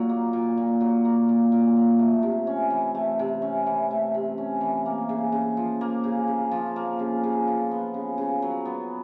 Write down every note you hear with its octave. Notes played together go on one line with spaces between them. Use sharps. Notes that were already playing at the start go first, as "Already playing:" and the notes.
Already playing: A#2 F#3
A#3
A#2
A#2
F#3
A#3
A#2
A#2
F#3
A3
C3
C#4
E3
A3
C3
C#4
E3
A3
C3
C#4
E3
A#3
C#3
C#3
F3
A#3
C#3
C#3
F3
A#3
C#3
C#3
F3
B3
C#3
C#3
F#3
B3